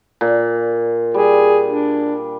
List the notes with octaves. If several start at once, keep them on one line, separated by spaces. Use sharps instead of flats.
A#2
G3 G#4
D4